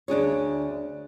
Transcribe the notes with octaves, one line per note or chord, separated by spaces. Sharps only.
D2 D4 G#4 C#5